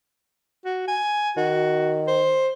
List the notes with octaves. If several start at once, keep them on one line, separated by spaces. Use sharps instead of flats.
F#4
G#5
D#3 F#4
C5